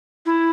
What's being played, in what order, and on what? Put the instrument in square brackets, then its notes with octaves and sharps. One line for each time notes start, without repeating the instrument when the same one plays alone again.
[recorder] E4